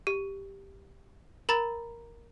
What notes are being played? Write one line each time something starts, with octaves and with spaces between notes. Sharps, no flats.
G4
A#4 A#5 B5 A6